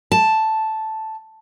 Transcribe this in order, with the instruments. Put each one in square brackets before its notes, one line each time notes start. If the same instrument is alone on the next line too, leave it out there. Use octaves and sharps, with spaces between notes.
[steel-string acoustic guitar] A5